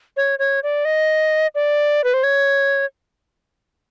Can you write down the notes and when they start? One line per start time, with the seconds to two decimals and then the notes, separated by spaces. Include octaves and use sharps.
0.17 C#5
0.39 C#5
0.63 D5
0.85 D#5
1.55 D5
2.04 B4
2.14 C5
2.23 C#5